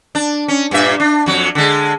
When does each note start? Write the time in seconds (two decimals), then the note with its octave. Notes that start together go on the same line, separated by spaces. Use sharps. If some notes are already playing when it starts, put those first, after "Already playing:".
0.15 D4
0.48 C#4
0.71 G2 A#2 E5
1.00 D4
1.26 F2 F#3
1.55 D3 G#3